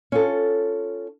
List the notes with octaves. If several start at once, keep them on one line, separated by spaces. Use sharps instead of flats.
C#4 F4 A4